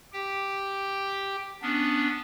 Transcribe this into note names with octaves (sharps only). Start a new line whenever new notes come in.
G4 G5
B3 C#4 D4